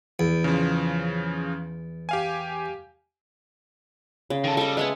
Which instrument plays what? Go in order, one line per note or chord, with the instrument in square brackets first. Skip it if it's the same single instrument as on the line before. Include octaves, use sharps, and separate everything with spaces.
[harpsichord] E2
[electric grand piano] C#3 F3
G4 F5 G#5
[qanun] C#3
[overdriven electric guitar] D#3 A4
[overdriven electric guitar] G3 [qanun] A4 D#5
[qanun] G#3 E5 G#5 [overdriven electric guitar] B3